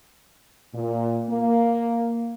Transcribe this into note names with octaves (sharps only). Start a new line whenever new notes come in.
A#2
A#3